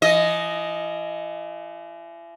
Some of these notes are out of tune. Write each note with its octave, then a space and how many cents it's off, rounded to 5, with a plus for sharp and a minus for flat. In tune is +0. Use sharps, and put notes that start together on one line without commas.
E3 +40 D#5 +0